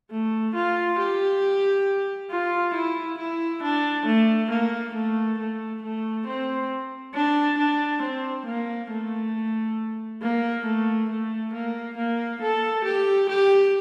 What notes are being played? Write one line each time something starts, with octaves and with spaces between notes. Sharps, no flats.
A3
F4
G4
F4
E4
E4
D4
A3
A#3
A3
A3
A3
C4
D4
D4
C4
A#3
A3
A#3
A3
A3
A#3
A#3
A4
G4
G4